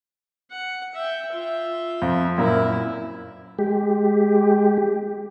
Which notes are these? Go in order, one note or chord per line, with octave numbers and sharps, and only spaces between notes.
F#5
E5 G5
F4 E5
F2
F#2 A#2 E4 A#4
G#3 G4